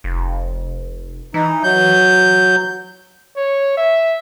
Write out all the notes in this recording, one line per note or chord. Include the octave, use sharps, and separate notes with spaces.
F1
E3 D#4
F#3 G6
C#5
E5